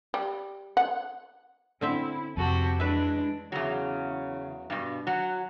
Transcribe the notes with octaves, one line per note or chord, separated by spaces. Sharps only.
G3
F#5
D3 C4 C#4 E4 E5
F2 C3 F#4 G4 A4
E3 G#3 D4 B4 E5
E2 C#3 F#3
G2 B2
F#3 F#5